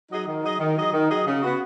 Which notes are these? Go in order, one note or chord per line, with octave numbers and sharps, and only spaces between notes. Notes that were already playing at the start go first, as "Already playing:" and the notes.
F#3 D#4 G#4 D#5
D#3
F#3 D#4 G#4 D#5
D#3
F#3 D#4 G#4 D#5
D#3
F#3 D#4 G#4 D#5
C#3
B3 F#4